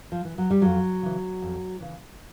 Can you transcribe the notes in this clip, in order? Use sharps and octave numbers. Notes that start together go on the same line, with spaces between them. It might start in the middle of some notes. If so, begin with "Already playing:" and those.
F3
E3
F#3
G3
F2 F#3
C#3 E3
F2
C#3 E3